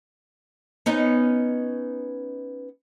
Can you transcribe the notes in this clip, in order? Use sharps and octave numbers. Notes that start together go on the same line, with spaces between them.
B3 C#4 D#4